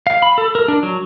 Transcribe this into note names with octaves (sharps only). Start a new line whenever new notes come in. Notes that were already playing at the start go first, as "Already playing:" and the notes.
F5
B5
A4
A#4
D4
F#3